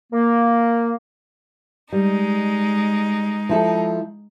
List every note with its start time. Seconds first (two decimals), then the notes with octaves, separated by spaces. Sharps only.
0.13 A#3
1.92 G3 G#3 D#4
3.49 F3 E4 A4